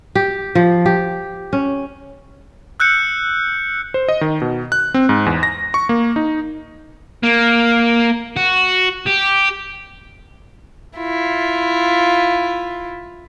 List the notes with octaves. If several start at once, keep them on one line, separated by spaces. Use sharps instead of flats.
G4
F3
G4
C#4
E6 F#6 G6 C#7
C5
D#5
D#3
B2
F#6
C4
G#2
E2
A#6
C#6
A#3
D#4
A#3
F#4
G4
E4 F4